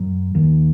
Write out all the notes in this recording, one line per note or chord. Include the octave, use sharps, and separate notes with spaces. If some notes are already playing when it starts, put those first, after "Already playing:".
Already playing: F#2 F#3
D#2 D#3